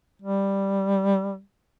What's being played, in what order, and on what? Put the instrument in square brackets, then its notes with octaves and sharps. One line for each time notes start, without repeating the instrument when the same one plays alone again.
[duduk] G3